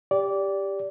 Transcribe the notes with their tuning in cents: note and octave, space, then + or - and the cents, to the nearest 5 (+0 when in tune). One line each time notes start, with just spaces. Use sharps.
G4 +10 D5 -15